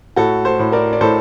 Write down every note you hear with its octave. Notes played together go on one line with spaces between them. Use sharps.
A2 F#4 A4
A4 C5
A2
A#4 D5
D5
A2 A4 C5